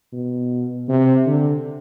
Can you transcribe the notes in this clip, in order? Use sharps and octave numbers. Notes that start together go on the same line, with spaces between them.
B2
C3
D3